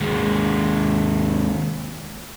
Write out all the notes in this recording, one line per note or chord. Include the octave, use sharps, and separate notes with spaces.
D#2 G#3